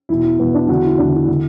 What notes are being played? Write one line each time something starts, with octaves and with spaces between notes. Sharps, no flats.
E2 B2 E4
E4
E2 B2 B3
D4
E2 D3 F#4
E4
E2 D3 D4
E4
D3